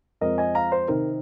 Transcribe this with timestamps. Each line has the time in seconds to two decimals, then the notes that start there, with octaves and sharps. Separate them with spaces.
0.21 F2 F3 G#3 C4 A#4 D#5
0.38 D#5 G#5
0.55 F5 A#5
0.72 C5
0.88 C3 D#3 C4 D#4 A#4